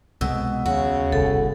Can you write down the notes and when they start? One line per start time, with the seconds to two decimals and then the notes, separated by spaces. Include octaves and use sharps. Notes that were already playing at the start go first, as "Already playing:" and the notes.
0.21 C2 B2 G#3 E6
0.66 D#2 C#3 F#4
1.12 G1 C2 A4